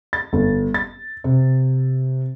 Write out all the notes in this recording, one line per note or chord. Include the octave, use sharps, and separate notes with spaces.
A6
G1
A6
C3